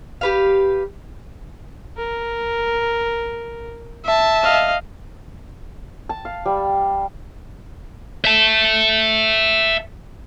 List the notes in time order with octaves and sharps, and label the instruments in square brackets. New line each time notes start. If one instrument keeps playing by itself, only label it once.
[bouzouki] G4 B4 F5
[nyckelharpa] A#4
[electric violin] E5 A5
[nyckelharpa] D#5 F5
[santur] A5
F5
G3
[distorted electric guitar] E5 A5